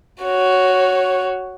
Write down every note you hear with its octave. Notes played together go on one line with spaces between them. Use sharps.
F#4 C#5